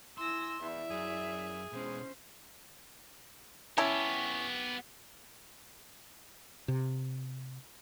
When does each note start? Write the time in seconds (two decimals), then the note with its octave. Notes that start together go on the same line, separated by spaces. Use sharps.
0.18 E4 G#5 C6 E6 A#6
0.61 E2 E4 D5 E5
0.91 F#2 G#4
1.73 B2 G#3 C#4 C5
3.78 B3 C#4 E4 G4 A5
6.68 C3